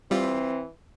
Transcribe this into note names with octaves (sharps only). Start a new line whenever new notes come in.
E3 G3 C4 F4